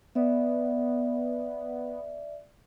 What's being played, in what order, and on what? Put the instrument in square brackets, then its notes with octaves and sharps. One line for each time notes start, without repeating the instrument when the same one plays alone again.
[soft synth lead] B3 [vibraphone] D5 E5